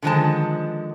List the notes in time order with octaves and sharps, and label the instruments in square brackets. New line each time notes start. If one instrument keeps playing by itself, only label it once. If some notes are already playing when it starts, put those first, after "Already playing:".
[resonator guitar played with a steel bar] D3 D#3 F3 G#3 C5 A5